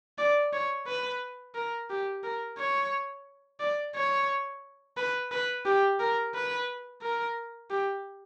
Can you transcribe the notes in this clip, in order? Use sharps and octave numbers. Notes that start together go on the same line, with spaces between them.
D5
C#5
B4
A#4
G4
A#4
C#5
D5
C#5
B4
B4
G4
A#4
B4
A#4
G4